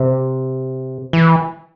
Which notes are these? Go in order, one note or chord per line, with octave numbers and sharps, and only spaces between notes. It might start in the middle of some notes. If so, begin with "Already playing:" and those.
Already playing: C3
E3